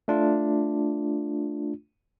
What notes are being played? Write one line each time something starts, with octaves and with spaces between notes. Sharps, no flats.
A3 D4 F4